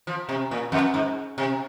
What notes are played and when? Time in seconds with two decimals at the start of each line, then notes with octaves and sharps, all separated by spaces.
0.07 F3
0.29 C3
0.51 A#2
0.72 F2
0.94 G#2
1.38 C3